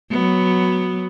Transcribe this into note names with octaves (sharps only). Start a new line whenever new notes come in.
F#3 B3